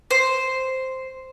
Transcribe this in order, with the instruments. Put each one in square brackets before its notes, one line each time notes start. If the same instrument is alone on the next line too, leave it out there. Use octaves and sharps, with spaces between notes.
[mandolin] C5